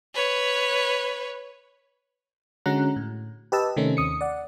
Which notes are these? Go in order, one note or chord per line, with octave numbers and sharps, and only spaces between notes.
B4 C#5
D3 G#3 C#4 F#4 A#5 F#6
A2
G4 B4 D#5 A5 E6
C3 D#3 A3 C4 C#4 D#4
D#2 D#6 C#7
D5 F#5